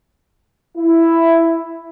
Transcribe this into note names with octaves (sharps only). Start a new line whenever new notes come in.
E4